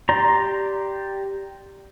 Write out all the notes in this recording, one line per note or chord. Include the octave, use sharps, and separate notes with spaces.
G4 D5 A#5 C6